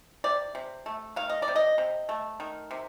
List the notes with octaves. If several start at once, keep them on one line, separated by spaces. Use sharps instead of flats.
C3 D5
C3
A3
D#3 F5
D#5
D5
C3
D#5
C3
A3
D#3
C3